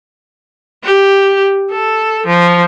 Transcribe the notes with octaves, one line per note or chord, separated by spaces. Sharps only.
G4
A4
F3